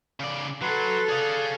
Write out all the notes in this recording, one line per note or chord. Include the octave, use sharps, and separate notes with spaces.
C#3 D5
F#3 A4 B4 C6
G#4 D5 F5 D#6 F#6